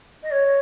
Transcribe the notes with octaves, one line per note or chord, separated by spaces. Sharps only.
D#5
C#5